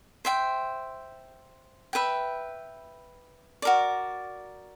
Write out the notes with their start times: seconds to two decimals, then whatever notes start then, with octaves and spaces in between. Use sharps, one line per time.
0.25 C5 E5 G5
1.93 B4 E5 G5
3.62 F#4 A#4 D5